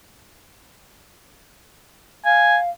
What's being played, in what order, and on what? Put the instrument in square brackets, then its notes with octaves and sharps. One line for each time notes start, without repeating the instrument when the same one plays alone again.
[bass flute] F5 [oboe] G#5